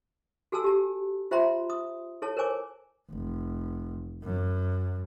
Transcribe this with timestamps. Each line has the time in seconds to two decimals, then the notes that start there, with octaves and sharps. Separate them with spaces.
0.52 F#4 A4 G#5 A5 E6
0.64 G4 A5
1.31 F4 C5 E5 G5 A#5 C6
1.70 D#6
2.22 E4 A4 C#5 A5
2.37 A#4 C5 C#5 G#5 D6
3.10 F1
4.23 F#2